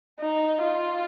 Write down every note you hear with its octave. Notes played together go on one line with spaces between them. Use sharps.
D#4
F4